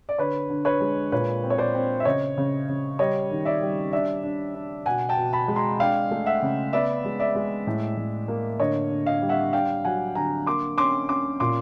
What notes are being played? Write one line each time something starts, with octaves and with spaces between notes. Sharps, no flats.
D5
D3 B4 C#5
D3
B4 C#5
G#3
A#2 B4 C#5
C4
C#5
C5 D5
C4
E5
C#3 C#5 D#5
C#3
C#3
G3 C#5 D#5
D#3
D5 E5
G3
D4 D5 E5
D4
D4
B2 F#5 G#5
G5 A5
B2
A5 B5
G#3
A#5 C6
D4 F5 G5
A3
E5 F#5
C#3
B3 D5 E5
G#3
D5 E5
G#3
A2
A2
A#3
D3 C#5 D#5
D3
D#5 F5
G3
E5 F#5
D4 F5 G5
F#3 F#5 G#5
D3 G#5 A#5
A#3 C6 D6
C#4 C6 D6
C#4 C6 D6
A#2 C6 D6